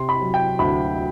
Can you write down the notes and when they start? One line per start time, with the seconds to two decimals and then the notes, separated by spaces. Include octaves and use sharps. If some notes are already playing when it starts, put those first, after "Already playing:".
Already playing: C3 C6
0.09 B5
0.22 F#3
0.34 G5
0.59 D2 B5